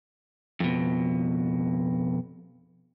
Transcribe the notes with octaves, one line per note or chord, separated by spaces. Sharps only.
F2 B2